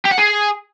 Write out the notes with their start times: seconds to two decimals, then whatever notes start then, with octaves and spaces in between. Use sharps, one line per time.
0.05 G4
0.11 F#5
0.18 G#4